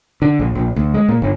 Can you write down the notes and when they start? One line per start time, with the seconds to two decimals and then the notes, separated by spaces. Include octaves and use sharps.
0.22 D3
0.40 A#1
0.55 A#1
0.76 D2
0.94 G#3
1.09 A#2
1.22 G1